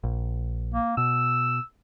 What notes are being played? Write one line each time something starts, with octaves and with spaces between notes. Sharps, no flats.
A#1
A#3
B2 E6